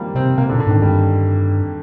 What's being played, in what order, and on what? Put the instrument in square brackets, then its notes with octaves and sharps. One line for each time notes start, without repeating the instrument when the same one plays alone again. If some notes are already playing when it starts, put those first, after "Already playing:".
Already playing: [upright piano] D#3 F3 G3 A#3
[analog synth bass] C3 [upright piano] C4
[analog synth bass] C3 [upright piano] A#3
[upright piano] D3
[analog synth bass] A#2
[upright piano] D3
[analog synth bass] G#2 [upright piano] D#3
[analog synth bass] G2 [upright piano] G3